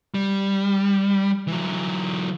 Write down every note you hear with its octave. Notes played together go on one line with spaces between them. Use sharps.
G3
E3 F#3